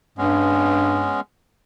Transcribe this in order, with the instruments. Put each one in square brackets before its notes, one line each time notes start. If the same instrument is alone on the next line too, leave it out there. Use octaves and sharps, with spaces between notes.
[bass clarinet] G2 [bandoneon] G#3 B3 C#4